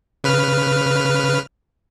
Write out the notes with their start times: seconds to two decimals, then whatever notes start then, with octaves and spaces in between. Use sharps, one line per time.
0.24 C#3 B4 F6